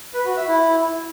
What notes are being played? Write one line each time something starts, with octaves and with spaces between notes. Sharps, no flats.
B4
F#4
E5
E4